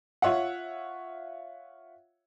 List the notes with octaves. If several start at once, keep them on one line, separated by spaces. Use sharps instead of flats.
F4 C#5 E5 F#5